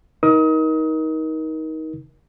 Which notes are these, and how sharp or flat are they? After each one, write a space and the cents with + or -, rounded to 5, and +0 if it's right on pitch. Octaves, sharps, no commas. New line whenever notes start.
D#4 +20 A#4 +25 D#6 +30